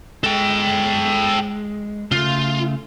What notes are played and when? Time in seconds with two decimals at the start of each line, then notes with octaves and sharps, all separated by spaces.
0.24 G#3 A4 G5
2.11 C#3 A3 F4